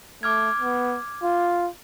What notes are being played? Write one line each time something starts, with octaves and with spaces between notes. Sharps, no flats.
A3 D6 F6 G#6
B3
F4